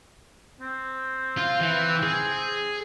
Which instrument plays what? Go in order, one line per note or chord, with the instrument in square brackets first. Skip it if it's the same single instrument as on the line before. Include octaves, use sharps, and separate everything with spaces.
[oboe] C4
[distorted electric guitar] F4
E3
G#4